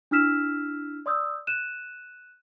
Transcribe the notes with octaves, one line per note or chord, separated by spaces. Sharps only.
D4 E4 E6 F6 B6 E7
D5 C6 D#6 E6 G6
F#6 D#7 E7